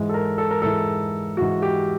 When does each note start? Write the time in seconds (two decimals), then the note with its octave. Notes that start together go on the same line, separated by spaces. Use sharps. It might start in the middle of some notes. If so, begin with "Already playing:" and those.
Already playing: G#2 E3 G#3
0.09 A4
0.14 A#4
0.38 A4
0.51 A#4
0.62 G#2 E3 G#3 A4
1.37 G#2 E3 G#3 F#4
1.62 G4